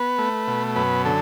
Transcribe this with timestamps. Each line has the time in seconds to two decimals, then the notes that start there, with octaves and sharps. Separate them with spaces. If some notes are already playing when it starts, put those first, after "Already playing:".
Already playing: B3 B4
0.18 A3
0.47 B2
0.76 F#2 B4
1.05 D3 A4